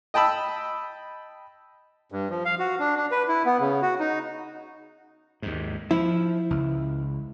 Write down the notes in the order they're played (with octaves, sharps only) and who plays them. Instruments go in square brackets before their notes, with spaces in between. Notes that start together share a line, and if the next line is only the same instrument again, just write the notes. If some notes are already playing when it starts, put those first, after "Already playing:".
[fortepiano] D#5 G5 A5 B5 E6
[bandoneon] G2
F3
F5
F#4
D4
D4
B4
E4
B3
C#3
F#4
D#4
[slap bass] D#2 G#2
[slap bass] F3 [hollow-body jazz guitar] E4
[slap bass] C#2